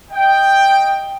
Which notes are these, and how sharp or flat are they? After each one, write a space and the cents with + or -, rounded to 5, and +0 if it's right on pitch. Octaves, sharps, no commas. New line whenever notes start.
D#5 +0 G5 +5